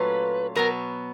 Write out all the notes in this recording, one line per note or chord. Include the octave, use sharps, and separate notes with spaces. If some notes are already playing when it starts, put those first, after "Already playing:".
Already playing: A#2 F#3 A3 C#4 F4 B4
B2 F#3 B3 A#4